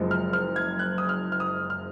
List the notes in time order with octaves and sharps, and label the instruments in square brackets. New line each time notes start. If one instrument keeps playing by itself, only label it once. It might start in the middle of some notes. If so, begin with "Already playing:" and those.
Already playing: [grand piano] F#1 F#2 F3 G#3
F6
F6
G#6
F#6
D#6
F6
F6
D#6
F6